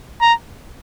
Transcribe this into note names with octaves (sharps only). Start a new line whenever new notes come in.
A#5